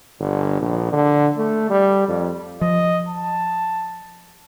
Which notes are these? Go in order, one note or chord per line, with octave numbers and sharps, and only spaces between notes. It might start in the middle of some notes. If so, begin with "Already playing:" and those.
G1
A#1
D3
A3
G3
F2
F3 D#5
A5